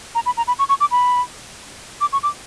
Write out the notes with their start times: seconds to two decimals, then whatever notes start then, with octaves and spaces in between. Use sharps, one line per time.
0.15 A#5
0.26 B5
0.37 A#5
0.48 B5
0.59 C#6
0.69 C#6
0.80 D6
0.91 B5
2.01 D6
2.13 C#6
2.23 D6